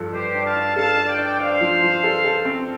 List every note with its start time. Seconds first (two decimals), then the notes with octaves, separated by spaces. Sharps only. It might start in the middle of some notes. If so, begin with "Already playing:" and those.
Already playing: G2 F3 A4
0.13 G2 G4 C5
0.35 D4
0.45 F5 A5
0.56 D4
0.76 A4 F5 A5
0.97 D4
1.08 D5 G5
1.19 D4
1.39 D4 C5 F5
1.61 F3
1.82 F3
2.04 A4
2.24 A4
2.45 C4